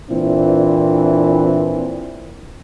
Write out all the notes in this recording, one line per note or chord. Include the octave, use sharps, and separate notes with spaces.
A#2 E3 C4 D4 E4